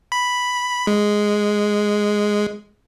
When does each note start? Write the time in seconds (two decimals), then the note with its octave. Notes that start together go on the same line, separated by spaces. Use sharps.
0.12 B5
0.87 G#3